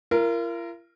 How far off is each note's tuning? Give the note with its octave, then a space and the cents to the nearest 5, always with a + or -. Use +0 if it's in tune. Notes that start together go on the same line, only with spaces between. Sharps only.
F4 -45 A#4 +0